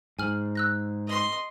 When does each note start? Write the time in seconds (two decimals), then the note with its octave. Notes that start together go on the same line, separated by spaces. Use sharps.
0.19 G#2 G#5 F6 F#7
0.55 E6 F#6 A#6
1.07 D#5 C6